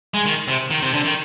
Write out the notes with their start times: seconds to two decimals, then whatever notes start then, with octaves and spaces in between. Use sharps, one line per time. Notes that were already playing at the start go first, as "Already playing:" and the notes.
0.14 G#3
0.26 D#3
0.48 C3
0.71 D#3
0.82 C3
0.93 D3
1.05 D#3